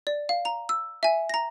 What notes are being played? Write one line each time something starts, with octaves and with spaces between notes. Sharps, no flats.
D5
F5
A#5 F7
E6
E5 G#5
A#5 A#6